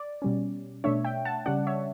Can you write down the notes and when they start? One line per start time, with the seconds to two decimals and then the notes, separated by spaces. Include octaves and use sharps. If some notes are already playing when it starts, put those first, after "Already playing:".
Already playing: D5
0.22 B2 G3 C#4
0.84 B2 A3 D4 C#5 E5
1.05 E5 G5
1.25 F#5 A5
1.46 C#3 G3 C#4 D5 F#5
1.67 C#5 E5